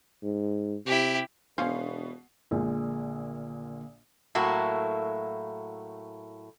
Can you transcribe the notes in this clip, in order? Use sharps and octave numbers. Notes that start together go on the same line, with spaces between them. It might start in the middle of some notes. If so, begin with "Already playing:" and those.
G#2
C3 E4 G4
E1 B2 F3 C#4 D4 C7
A#1 A#2 D3 G#3 A#3
A2 F#3 A#3 E4 F#4